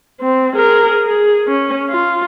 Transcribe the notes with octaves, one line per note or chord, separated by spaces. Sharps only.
C4
G#4 A#4
G#4
C#4
F4